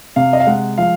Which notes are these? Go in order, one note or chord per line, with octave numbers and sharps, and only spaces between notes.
C3 F5
D#5
F5
G#3 F#5
F3 F5